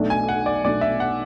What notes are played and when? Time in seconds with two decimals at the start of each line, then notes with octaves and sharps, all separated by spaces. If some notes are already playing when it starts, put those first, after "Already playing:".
Already playing: B1 B2 A3 D4
0.10 G#5
0.29 F#5
0.46 D5
0.64 B1 B2 A3 D4 D5
0.81 E5
1.00 F#5